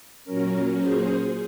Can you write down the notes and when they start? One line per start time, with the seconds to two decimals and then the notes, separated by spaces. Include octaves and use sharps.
0.24 A#2 F#3 C#4 A#4
0.77 G#4 C5